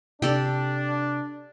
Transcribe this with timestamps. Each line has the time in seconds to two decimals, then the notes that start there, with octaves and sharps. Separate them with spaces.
0.22 C3 D4 G4 A4 D5